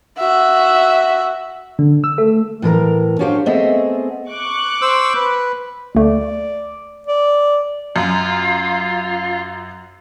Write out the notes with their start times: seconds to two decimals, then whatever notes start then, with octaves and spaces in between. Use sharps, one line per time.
0.18 F#4 E5
1.79 D3
2.04 E6
2.18 A3
2.62 A2 E3 A#4 A#5
3.19 C#4 D4 F#4 G4 C5 F5
3.46 A3 B3 C4 G#4 D#5 E5
4.30 C#6 D6 F#6
4.82 C5 E6
5.15 B4
5.95 D2 A3 D5
7.07 D5
7.96 F#2 F4